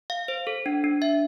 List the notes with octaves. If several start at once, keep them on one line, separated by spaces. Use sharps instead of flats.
F5
C5
A4
D4
D4
E5